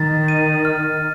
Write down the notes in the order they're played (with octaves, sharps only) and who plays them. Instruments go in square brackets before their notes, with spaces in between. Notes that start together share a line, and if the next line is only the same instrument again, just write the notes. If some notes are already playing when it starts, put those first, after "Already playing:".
Already playing: [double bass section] D#3 [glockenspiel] A6
[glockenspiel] D#7
F6